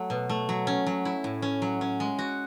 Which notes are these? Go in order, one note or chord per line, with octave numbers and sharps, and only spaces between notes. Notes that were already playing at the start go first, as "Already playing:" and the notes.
Already playing: F#3 A3
B2
A3
F#3
C#4
F#3
E4
A2
C#4
F#3
C#4
G#3
F#4